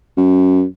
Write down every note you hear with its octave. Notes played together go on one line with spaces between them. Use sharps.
F#2